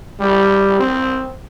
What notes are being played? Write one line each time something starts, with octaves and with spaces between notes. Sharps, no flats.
G3
C4